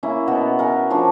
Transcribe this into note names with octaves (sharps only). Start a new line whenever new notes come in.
A#3 C#4 E4
B2 B3 C#4 F#4
A#4 F#5 G#5
F3 D4 C#5